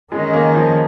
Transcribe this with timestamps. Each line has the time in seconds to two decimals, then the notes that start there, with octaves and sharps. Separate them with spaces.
0.12 D#3 G#3 C#4 A#4 D#5
0.33 A#3
0.54 F3